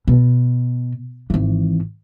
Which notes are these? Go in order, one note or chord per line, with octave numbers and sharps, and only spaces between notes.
B2
G#1 E3